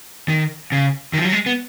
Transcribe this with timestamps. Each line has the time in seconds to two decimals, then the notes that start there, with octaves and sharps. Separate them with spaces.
0.28 D#3
0.72 C#3
1.13 D#3
1.18 F3
1.25 F#3
1.32 G#3
1.46 B3